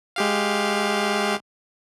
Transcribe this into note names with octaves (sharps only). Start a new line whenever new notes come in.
G#3 G4 F5